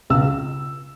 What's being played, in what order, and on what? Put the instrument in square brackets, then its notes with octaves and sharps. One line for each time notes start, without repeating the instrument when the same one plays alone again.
[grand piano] C#2 E6